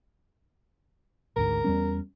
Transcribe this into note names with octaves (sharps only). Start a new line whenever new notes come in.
G#1 D2 G#2 A#4
E2 G3 C#4